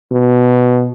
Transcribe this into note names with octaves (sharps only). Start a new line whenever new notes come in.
B2